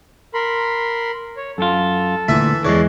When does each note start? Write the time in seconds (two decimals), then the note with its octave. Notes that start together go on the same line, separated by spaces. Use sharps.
0.34 A#4 B5 C6
1.37 C#5
1.58 F#2 F4 A4
2.28 D2 A#2 E3 E5 B5
2.64 E2 E3 G#3 C#5 D5